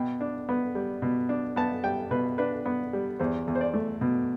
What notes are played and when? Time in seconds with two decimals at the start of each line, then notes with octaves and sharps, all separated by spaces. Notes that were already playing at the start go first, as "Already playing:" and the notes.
Already playing: B2 G5
0.21 D4
0.49 B3
0.75 G3
1.02 B2
1.29 D4
1.56 B3 A5
1.84 G3 G5
2.11 B2 B4
2.38 D4 B4
2.66 B3
2.93 G3
3.20 E2 C5
3.47 E2
3.55 C5
3.61 D5
3.74 A3
4.01 B2